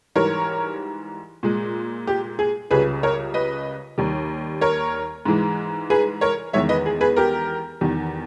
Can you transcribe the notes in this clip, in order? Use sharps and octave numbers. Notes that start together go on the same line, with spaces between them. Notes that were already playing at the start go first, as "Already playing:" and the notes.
G#2 E3 G3 A#4 C#5
A#2 G#3
G4
G#4
C#2 C#3 G3 G#4 B4
A#4 C#5
B4 D#5
D#2 D#3 G3
A#4 C#5
G#2 E3 G#3
G#4 B4
A#4 C#5
E2 D#3 G#3 C#5 E5
B4 D#5
G#4
G#4 B4
G4 A#4
E2 D#3 G3